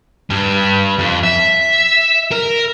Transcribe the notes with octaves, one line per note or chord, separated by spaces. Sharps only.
G2
F2
E5
A#4